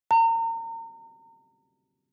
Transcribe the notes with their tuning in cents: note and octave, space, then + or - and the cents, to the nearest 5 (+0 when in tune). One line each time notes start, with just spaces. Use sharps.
A#5 -35